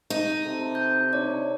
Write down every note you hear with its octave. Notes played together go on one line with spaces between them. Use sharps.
D#4
C3 A4
G6
D4 D#4 C#5 D5